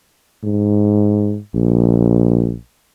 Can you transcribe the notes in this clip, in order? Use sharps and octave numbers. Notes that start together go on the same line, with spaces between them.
G#2
A#1